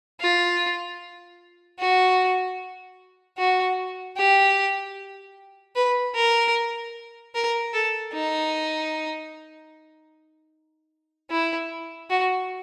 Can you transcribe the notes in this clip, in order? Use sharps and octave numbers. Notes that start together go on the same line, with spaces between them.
F4
F#4
F#4
G4
B4
A#4
A#4
A4
D#4
E4
F#4